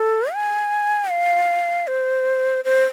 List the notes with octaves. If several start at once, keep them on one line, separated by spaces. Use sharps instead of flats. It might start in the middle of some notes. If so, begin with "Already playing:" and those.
Already playing: A4
G#5
F5
C5
C5